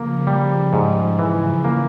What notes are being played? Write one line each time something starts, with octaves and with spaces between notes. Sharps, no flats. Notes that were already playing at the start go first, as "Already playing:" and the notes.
Already playing: C#3 F3 A#3
G3
G#2
E3
A#3